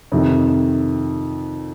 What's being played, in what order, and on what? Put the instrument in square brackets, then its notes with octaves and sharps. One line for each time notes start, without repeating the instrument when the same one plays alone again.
[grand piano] F2 C3 D#3